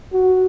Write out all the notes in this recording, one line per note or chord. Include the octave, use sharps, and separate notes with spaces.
F#4